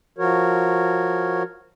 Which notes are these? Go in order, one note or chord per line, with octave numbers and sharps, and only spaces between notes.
F3 F#4 A#4 C#5